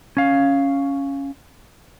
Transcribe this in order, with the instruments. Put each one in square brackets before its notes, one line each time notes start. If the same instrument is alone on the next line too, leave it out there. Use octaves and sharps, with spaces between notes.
[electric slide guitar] C#4 F5